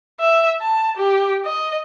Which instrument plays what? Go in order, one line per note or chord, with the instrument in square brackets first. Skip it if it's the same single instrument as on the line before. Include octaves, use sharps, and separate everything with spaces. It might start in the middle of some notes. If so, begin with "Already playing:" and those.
[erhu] E5
A5
G4
D#5